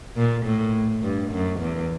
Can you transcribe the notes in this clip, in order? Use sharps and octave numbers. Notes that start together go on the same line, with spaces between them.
A#2
A2
G2
F#2
E2